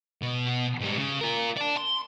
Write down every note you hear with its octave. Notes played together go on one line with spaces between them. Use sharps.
B2
G#2 G3
C#3
F4 A#4
D5 A5
C6